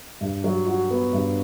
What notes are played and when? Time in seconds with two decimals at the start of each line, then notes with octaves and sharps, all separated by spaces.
0.21 G2
0.44 F#3
0.66 F#4
0.90 B3
1.13 G2